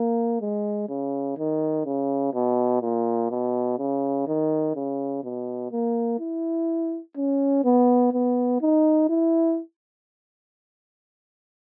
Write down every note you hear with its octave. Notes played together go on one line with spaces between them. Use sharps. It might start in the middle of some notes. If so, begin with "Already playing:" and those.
Already playing: A#3
G#3
C#3
D#3
C#3
B2
A#2
B2
C#3
D#3
C#3
B2
A#3
E4
C#4
B3
B3
D#4
E4